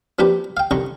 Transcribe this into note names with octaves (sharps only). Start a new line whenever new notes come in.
F3 A#3 C4 D4 G4 B4
F5 G5
C2 D3 D#3 A#5 C#6